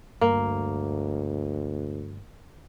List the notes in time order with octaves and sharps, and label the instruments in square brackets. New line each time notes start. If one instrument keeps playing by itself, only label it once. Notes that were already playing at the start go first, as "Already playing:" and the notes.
[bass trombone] D2 [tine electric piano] G2 [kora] A#3